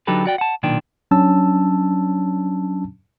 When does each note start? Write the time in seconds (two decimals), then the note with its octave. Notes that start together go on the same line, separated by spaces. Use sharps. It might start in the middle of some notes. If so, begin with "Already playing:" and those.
0.07 D3 F#3 D#4 G4 A4 B4
0.25 F#4 D5 G5
0.38 F#5 A5
0.63 B1 A#2 D#3 D4 G5
1.11 F#3 C#4 D4 A5 E6